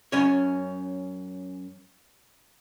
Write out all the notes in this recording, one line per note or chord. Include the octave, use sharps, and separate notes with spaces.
F#2 C#4 C#5